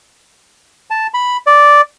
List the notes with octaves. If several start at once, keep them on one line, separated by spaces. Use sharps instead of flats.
A5
B5
D5